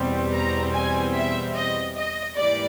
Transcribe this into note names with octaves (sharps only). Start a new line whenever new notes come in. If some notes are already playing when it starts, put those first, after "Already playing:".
Already playing: E2 B2 G3 C4
A#5
G#5
E5
D#5
D#5
G#2 E3 G3 A#3 D5